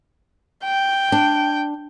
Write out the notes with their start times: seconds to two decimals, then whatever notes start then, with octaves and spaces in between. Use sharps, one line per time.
0.65 G5
1.12 D4